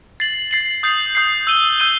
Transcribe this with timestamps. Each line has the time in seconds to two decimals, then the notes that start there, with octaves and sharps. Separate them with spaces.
0.20 A6 C7 F#7
0.51 A6 C7 F#7
0.83 D#6 G6 C7
1.15 D#6 G6 C7
1.47 E6 G6 D#7 G7
1.78 E6 G6 D#7 G7